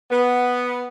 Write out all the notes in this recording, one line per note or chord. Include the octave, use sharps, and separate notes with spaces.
B3